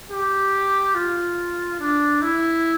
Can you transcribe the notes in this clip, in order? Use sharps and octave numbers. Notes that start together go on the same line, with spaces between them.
G4
F4
D4
E4